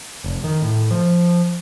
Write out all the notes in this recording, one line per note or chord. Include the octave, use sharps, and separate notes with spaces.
F1
D#3
A2
F3